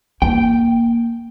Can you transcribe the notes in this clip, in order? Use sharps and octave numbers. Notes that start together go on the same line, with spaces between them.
A#3 G5